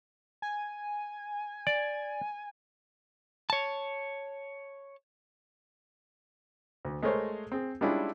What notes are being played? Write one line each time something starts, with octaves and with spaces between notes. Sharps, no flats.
G#5
D5
C#5 A5
D2
G#3 A3 A#4 C5 C#5
C4 G#4
G3 G#3 C#4 D4 E4 F4